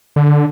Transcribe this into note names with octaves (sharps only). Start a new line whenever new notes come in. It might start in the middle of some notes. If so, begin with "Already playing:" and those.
D3